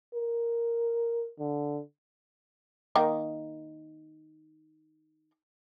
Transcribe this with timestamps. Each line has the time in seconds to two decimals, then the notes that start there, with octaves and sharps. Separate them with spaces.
0.14 A#4
1.39 D3
2.95 D#3 A#3 D#4